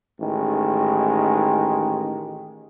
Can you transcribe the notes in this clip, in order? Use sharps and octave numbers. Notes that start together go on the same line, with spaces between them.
A1 D#3 G#3